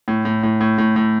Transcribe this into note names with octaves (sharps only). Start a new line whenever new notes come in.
A2
A2
A2
A2
A2
A2